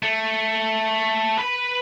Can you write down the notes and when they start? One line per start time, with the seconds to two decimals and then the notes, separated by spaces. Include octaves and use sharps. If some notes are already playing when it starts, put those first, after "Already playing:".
0.03 A3
1.39 B4 B5